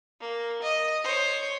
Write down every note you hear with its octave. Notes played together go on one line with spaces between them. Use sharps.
A#3
D#5
C5 C#5